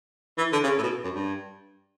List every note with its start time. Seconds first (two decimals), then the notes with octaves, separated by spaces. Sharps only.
0.38 E3
0.52 D3
0.63 C#3
0.78 A2
0.83 B2
1.04 F#2
1.14 G2